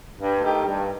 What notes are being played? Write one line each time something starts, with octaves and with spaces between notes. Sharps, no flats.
G2
D#3 A3 D#4 G4
G2